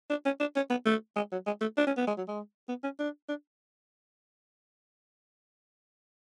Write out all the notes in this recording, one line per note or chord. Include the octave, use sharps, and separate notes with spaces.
D4
C#4
D4
C#4
B3
A3
G#3
F#3
G#3
A3
D4
C#4
B3
G#3
F#3
G#3
B3
C#4
D4
D4